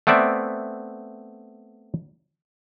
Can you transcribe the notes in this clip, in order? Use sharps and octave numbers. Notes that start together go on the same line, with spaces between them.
A3 B3 C4 D5 E5